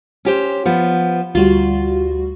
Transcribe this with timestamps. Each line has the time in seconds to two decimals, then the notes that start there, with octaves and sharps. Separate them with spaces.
0.25 C#4 G4 C5
0.65 F3 B3
1.35 D2 G3 F4 F#4